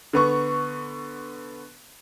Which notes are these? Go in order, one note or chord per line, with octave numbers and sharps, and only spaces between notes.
D3 B3 C#6